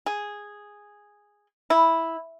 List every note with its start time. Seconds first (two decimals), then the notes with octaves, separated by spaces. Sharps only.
0.06 G#4
1.70 E4